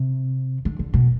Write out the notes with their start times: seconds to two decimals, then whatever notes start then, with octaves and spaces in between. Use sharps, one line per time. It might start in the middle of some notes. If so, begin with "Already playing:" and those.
Already playing: C3
0.65 D3
0.79 D3
0.94 B2